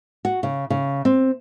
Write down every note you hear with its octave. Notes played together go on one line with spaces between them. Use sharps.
F#4
C#3
C#3
C4